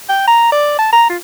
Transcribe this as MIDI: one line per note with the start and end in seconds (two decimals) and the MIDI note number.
0.09 0.27 79
0.28 0.51 82
0.52 0.77 74
0.79 0.90 81
0.93 1.05 82
1.09 1.17 65